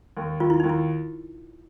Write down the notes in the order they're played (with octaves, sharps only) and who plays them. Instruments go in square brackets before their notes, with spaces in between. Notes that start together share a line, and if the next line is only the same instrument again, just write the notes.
[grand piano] D#2
[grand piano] D#2 [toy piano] F4
[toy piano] E4
[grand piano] D#2 [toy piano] D#4
[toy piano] E4